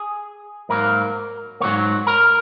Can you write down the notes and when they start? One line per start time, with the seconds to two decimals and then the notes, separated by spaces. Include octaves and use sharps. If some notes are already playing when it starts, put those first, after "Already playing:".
Already playing: G#4
0.69 G#2 F#3 A#3 A#4
1.60 G#2 F#3 A#3 C#5
2.07 A#4